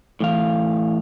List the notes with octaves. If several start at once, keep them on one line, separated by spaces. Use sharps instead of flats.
A2 E3 F5